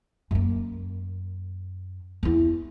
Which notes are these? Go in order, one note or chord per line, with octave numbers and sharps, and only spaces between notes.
F#2 A#3
E2 E4